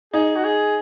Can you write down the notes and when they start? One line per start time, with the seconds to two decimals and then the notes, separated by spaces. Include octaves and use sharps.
0.13 D#4 G#4
0.36 F#4
0.44 G#4